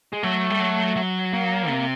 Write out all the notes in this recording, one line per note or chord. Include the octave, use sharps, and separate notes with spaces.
G#3
F#3 A3
G3
F#3
F#3
A#3
C3